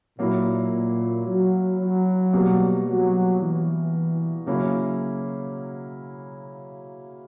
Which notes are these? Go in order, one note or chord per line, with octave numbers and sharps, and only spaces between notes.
A#2 F#3 A#3 E4
A#2
F#3
F#3
B2 G3 A#3
F#3
E3
C#3 F#3 A#3 C#4 E4